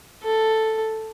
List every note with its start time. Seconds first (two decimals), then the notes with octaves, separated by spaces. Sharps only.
0.24 A4